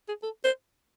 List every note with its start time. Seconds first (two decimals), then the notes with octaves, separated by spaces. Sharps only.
0.08 G#4
0.23 A4
0.44 C5